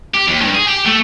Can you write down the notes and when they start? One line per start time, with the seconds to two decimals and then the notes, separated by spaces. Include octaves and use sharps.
0.14 G4
0.28 D#2
0.41 G2
0.55 G#4
0.68 G4
0.86 A3